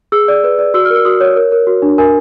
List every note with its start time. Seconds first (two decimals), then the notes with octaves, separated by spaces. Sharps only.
0.12 G#4 E6
0.28 D5
0.44 B4
0.59 D5
0.74 F#4 E6
0.85 F6
0.90 A#4 E6
1.05 F#4 D#6
1.21 C#5
1.36 A#4
1.52 A#4
1.67 F#4
1.82 D4
1.98 A#4 G#5